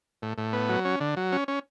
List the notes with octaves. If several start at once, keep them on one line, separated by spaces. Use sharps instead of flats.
A2
A2
B3
F#3
C#4
D3
F#3
C#4
C#4